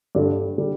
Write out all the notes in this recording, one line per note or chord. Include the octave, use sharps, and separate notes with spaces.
G2 D3 G3
D3 G3